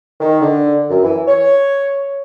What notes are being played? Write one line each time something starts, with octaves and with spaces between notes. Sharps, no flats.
D#3
D3
F#2
E3
C#5